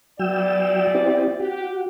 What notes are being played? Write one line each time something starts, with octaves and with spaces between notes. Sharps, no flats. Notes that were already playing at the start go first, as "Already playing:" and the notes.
E2 F#3 D5 G5 E6
C4 E4 G4
F#4 G4